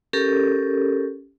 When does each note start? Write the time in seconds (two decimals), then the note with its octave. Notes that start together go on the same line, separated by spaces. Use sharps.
0.13 C#4 G4 A4 A#4